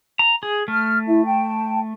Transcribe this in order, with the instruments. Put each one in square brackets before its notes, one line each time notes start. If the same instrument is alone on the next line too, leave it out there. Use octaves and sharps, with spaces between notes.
[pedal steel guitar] A#5
G#4
[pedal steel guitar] A3 [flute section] F6
[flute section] E4 E5
G5 A5